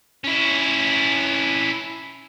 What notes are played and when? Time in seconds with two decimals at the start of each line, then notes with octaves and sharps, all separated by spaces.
0.24 C#4 E4